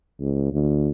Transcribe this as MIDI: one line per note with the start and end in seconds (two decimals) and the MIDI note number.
0.20 0.50 37
0.52 0.91 38